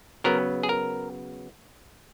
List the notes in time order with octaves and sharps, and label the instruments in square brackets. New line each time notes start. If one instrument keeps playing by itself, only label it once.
[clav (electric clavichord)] C#3 F#3 B3 A#4
G#4
A#4